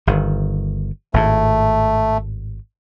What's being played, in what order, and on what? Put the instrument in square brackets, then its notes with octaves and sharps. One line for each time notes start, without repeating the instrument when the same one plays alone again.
[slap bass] G1 D#3
[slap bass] G#1 A2 [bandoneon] A3